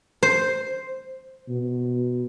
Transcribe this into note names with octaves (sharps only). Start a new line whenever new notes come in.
C5
B2